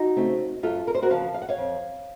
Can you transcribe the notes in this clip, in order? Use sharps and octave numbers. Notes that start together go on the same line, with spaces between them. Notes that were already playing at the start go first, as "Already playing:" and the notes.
Already playing: D#4 F#4
C#3 A3 C4
F#2 F4 A4
A#4
C5
F#4 A#4
C#3 F3 F5 A5
F5
F#5
C#5 F5
F2